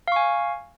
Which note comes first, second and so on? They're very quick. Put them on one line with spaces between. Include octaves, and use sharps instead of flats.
F5 C#6 G#5